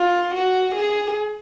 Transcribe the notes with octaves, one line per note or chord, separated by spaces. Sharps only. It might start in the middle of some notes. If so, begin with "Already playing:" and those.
Already playing: F4
F#4
G#4